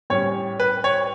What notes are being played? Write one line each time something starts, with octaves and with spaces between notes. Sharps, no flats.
A2 G3 C#4 C#5
B4
C#5